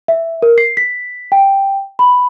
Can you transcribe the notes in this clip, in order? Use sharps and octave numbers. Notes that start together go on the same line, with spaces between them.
E5
A#4
C7
B6
G5
B5